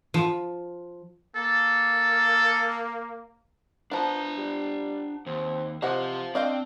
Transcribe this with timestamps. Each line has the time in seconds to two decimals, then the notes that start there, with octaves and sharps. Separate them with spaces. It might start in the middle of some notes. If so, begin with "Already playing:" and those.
0.14 F3
1.36 A#3 A4
3.92 F3 B3 D4 A#5
4.38 G3
5.26 D#2 C4
5.82 C3 C5 D#5 F5 F#5
6.35 C4 D4 D#5 F5 G5